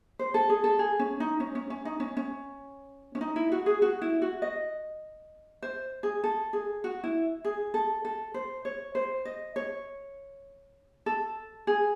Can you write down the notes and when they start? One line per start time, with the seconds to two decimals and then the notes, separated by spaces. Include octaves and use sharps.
0.19 C5
0.34 A4
0.49 G#4
0.64 A4
0.79 G#4
0.99 C#4
1.20 D#4
1.40 C#4
1.55 C#4
1.70 C#4
1.85 D#4
2.00 C#4
2.17 C#4
3.15 C#4
3.21 D#4
3.36 E4
3.52 F#4
3.66 G#4
3.82 F#4
4.02 E4
4.22 F#4
4.42 D#5
5.62 C5
6.03 G#4
6.24 A4
6.53 G#4
6.84 F#4
7.04 E4
7.45 G#4
7.74 A4
8.05 A4
8.34 C5
8.65 C#5
8.95 C5
9.25 D#5
9.56 C#5
11.06 A4
11.67 G#4